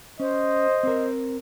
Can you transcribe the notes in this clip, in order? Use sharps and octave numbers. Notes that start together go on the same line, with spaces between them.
C#4 C5 D#5
C4 A#4